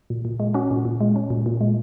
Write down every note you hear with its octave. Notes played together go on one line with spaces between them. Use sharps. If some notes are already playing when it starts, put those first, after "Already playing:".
A#2
A#2
G#3
C#4 F#4
A#2
A#2
G#3
C#4
A#2
A#2
G#3